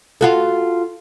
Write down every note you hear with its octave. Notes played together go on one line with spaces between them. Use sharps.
F4 F#4 A4